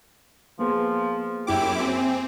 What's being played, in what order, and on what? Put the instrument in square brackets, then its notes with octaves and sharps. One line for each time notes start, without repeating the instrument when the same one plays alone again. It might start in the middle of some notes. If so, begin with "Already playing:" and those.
[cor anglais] F3 [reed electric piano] A#3 B3 G#4
[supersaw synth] F#2 E4 D6 [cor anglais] G4
[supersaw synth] C4 [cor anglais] G#5